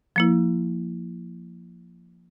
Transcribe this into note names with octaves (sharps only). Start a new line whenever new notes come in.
F3 A#3 E4